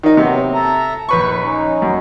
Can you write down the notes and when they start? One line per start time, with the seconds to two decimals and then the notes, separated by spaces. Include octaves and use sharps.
0.03 D#3 D#4
0.17 C3 F#3 B3
0.54 A4 E5 A#5
1.09 A#1 D#2 B4 C#6
1.40 C#4 D#4
1.82 F#2